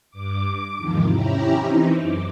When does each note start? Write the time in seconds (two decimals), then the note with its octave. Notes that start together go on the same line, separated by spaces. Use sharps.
0.11 G2 D6
0.45 D6
0.78 E2 G#2 C3 D#3 F3
1.11 C#4 E4 G4 A#5
1.56 E3 C4 D#4
1.98 F#2 D6